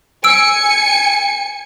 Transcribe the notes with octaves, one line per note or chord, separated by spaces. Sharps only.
G#5 E6 C#7 D7